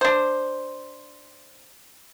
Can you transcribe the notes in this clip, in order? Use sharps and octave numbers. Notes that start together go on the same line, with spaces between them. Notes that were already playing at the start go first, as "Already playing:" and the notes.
D4 C5